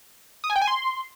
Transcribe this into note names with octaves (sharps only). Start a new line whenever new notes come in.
D#6
G#5
G5
G#5
C6